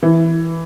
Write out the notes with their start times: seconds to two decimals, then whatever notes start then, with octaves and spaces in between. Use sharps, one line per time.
0.03 E3